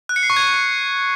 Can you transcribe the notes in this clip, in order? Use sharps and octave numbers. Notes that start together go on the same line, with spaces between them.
F#6
C#7
C7
C#6
G#6